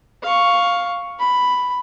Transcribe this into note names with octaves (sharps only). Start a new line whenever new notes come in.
F5 C#6
B5